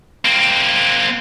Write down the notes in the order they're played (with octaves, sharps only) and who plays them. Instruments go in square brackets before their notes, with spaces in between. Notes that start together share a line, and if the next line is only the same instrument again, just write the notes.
[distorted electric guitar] A#3 C4